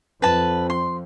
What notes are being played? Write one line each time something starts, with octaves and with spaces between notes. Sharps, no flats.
F2 B4 A5
C6